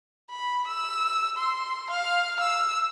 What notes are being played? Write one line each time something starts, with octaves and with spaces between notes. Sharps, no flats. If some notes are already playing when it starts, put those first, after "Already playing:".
B5
E6
C6
F5
E6